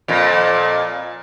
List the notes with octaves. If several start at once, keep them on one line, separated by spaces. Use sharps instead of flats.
F2 A#2